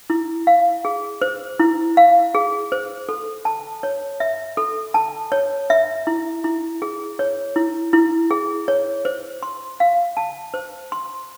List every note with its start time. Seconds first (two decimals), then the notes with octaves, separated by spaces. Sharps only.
0.10 E4
0.47 F5
0.85 G#4
1.22 C5
1.60 E4
1.97 F5
2.35 G#4
2.72 C5
3.09 A4
3.45 A5
3.83 C#5
4.20 E5
4.57 A4
4.94 A5
5.32 C#5
5.70 E5
6.07 E4
6.44 E4
6.82 G#4
7.19 C#5
7.56 E4
7.93 E4
8.31 G#4
8.68 C#5
9.05 C5
9.43 C6
9.80 F5
10.17 A5
10.54 C5
10.92 C6